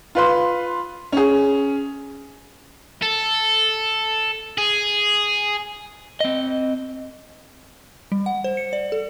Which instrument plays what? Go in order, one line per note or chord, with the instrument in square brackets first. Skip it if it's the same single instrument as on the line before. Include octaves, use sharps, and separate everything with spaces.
[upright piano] F4 B4 C6
C#4 G#4
[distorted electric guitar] A4
G#4
[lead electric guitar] C4 D#5
[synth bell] G3
F#5
C5
C#7
D5
A4